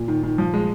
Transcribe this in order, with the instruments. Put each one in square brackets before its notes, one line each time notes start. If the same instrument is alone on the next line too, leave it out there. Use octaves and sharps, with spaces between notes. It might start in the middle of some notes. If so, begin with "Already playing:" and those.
Already playing: [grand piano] A#2
[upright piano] D#3
D#3
F3
G#3